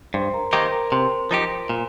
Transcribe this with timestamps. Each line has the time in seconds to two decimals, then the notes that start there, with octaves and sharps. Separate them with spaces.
0.14 G2 C5 C6
0.34 A#4 A#5
0.52 D#3 A#3 D#4 G4 C5 C6
0.72 A#4 A#5
0.92 C3 C5 C6
1.31 F3 D#4 G4
1.69 A#2